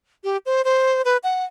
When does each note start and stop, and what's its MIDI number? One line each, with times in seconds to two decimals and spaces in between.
0.24 0.37 67
0.46 0.62 72
0.65 1.02 72
1.05 1.17 71
1.24 1.45 78